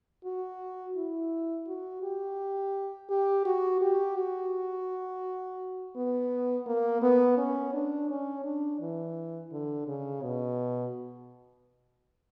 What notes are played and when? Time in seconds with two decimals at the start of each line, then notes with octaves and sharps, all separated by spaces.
0.25 F#4
0.96 E4
1.67 F#4
2.03 G4
3.10 G4
3.46 F#4
3.82 G4
4.17 F#4
5.96 B3
6.67 A#3
7.02 B3
7.38 C#4
7.74 D4
8.09 C#4
8.45 D4
8.81 E3
9.52 D3
9.88 C#3
10.23 B2